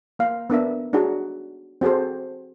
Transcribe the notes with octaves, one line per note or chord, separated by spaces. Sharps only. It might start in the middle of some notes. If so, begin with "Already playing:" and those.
A#3 F5
B3 D4 A#4 E5
D4 D#4 F#4 G#4
C4 F#4 G#4 A4 C5